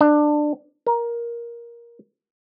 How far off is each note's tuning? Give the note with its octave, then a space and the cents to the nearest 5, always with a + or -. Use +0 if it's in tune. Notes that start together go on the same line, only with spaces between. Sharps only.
D4 +20
A#4 +15